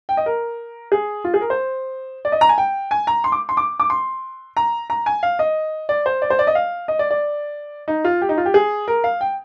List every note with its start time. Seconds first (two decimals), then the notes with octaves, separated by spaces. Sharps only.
0.09 G5
0.17 D#5
0.26 A#4
0.92 G#4
1.24 F4
1.34 G#4
1.41 A#4
1.50 C5
2.25 D5
2.32 D#5
2.41 A#5
2.49 G#5
2.58 G5
2.91 G#5
3.07 A#5
3.24 C6
3.32 D6
3.49 C6
3.57 D6
3.80 D6
3.90 C6
4.57 A#5
4.90 A#5
5.06 G#5
5.23 F5
5.39 D#5
5.89 D5
6.06 C5
6.22 D5
6.30 C5
6.39 D5
6.47 D#5
6.55 F5
6.88 D#5
6.99 D5
7.11 D5
7.88 D#4
8.05 F4
8.22 G4
8.29 D#4
8.38 F4
8.46 G4
8.54 G#4
8.88 A#4
9.04 F5
9.21 G5